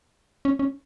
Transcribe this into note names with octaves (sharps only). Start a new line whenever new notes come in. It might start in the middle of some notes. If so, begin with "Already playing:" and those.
C#4
C#4